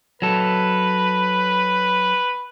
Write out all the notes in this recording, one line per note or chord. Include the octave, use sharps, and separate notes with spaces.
F#3 A4 B4